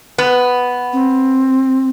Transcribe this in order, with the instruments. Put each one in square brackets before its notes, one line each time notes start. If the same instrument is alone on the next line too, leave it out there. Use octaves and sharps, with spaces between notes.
[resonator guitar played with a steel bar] B3
[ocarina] C4